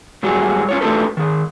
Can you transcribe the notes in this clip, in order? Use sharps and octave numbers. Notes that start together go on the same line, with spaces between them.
G#2 F#3 G3 F#4 G#4
C#4 F4 C#5
A3 D4 F4 G4 A4 B4
D#3 G#4